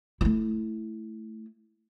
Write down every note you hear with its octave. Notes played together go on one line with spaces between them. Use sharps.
A3 E4